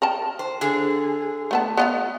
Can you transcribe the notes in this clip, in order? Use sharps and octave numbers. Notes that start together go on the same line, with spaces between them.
A#4 G5 A5
C5
D3 G#4
A3 B3 A5
B3 D#5 F5